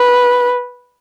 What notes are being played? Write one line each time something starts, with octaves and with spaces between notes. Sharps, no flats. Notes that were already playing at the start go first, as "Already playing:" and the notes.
Already playing: B4